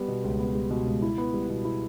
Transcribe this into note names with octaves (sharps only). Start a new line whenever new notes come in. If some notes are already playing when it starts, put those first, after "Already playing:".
Already playing: G3 B3
B2
C#2
B3
G3
B2
C#2
E4
B3
G3
B2
E4